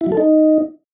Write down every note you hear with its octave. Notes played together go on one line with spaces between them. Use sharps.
E4
F#3
A4
D#4